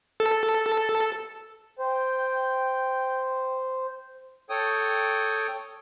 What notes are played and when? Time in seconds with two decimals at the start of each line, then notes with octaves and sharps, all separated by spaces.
0.20 A4
1.79 C5 G5
4.50 A4 C#5 G5 D#6